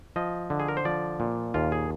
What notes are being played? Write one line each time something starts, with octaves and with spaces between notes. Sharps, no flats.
F3 D#5
D3
G#4
A#4
C5
F3 D5
A#2
D#2 F4
G#4